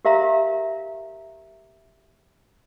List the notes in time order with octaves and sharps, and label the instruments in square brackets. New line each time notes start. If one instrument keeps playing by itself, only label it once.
[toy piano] G4 A#4 E5 F5 A#5